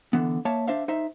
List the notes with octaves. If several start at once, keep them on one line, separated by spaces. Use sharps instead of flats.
D3 E3 B3
A#3 C#5 E5 A5
D4 C5 E5 F5
D#4 C5 E5